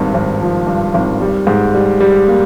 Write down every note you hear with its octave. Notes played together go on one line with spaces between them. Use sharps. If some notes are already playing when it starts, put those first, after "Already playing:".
Already playing: G#1 G2
G#1
F3
G2
G#1
G3
G#2
G3
G3
A#3